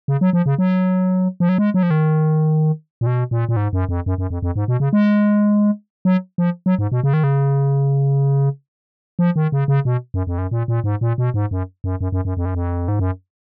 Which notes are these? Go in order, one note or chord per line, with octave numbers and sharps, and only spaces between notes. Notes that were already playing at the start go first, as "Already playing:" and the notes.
C#3
F#3
F3
C#3
F#3
F3
F#3
G#3
F#3
F3
D#3
A#2
B2
A#2
A#2
G#2
F#2
F2
F#2
F#2
F2
F2
G#2
B2
C#3
G#3
F#3
F3
F#3
G#2
B2
C#3
D#3
C#3
F3
D#3
C#3
C#3
B2
F#2
F2
F#2
A#2
A#2
G#2
A#2
B2
G#2
F#2
F#2
F#2
F#2
F#2
F2
F#2
F2
G#2
F#2